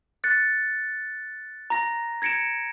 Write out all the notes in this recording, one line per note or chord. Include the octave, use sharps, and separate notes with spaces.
F#6 A6 C#7
A#5 A#6
G#6 A#6 C#7 D7 E7